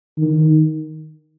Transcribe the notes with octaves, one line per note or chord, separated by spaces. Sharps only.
D#3